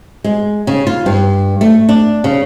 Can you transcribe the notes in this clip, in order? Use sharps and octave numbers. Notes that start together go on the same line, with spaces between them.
G#3
C#3
F4
G2
A3
D4
C#3